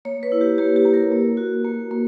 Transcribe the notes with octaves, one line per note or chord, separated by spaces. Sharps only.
A#3 C#5
B4
E4
G4
A#3 G4
G4
A#3
A#4
A#3
F#4
A#3
A#3